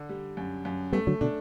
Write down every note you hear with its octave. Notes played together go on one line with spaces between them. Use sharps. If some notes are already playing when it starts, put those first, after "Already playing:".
Already playing: D3
G3
F#2
F#2
G3 A3 B3
D3 F#3
B2 D3 D4